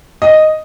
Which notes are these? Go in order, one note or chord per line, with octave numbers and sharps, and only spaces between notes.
D#5